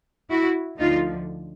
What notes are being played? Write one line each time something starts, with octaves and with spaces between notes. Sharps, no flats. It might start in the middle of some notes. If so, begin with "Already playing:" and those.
E4 F#4
D2 D3 F3 D#4 F4